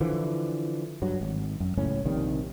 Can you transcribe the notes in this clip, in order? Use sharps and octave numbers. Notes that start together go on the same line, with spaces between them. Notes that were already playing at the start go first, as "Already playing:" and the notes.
D3 E3 F3
G2 F#3
G#1
F#2
F#1 C#2 A2 C#4
A#1 C3 D#3 G3